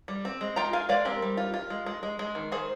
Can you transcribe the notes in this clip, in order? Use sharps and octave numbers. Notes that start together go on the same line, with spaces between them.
G3
C4
G#3
F4 G5 A#5
F4 F5 G#5
G#3 D5 F5
C4 G4 A#4
G3
F4
F4
G#3
G#3
G#3
G#3
D#3
D#3 G#4 C5